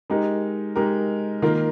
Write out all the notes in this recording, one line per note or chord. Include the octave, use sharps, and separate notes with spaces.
G#3 D#4 G4 A#4
G#3 D#4 G4 A#4
D#3 A#3 F4 A#4